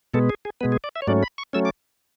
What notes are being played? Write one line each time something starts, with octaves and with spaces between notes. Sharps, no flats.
B2 G#3 B3 A4
G#4
G#4
B2 G#3 B3 B4
G#4
D5
E5
C#5
G#2 F#3 A3 C#4 D5
B5
C#6
F#3 A3 C#4 E6
D6